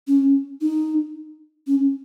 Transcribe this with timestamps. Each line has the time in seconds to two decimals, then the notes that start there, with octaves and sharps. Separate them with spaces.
0.08 C#4
0.61 D#4
1.67 C#4